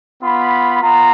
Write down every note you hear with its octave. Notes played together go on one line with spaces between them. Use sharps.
B3 F4 B5
B3 F4 A#5